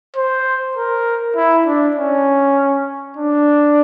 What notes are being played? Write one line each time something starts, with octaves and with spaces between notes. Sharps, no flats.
C5
A#4
E4
D4
C#4
D4